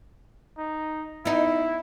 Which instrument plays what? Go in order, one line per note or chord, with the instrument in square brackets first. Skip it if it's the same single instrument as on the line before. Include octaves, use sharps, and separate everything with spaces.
[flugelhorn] D#4
[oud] B3 D#4 [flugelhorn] E4